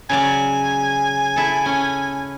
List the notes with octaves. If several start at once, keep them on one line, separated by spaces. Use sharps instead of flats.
C#3 F#3 D5 G#5
E4 A4
C#4